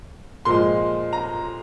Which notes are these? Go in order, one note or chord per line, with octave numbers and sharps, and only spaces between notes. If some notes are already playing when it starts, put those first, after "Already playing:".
A#2 F3 G#3 C6
A#5